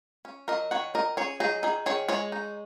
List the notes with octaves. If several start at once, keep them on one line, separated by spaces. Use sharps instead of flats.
C#4
F#3 A#4 D#5
D#3 C#5 F#5
D#3 A#4 D#5
C#4 G#4 C#5
F#3 D#4 G#4
D#3 D#4 G#4
D#3 G#4 C#5
G#3 G#4 C#5
D#4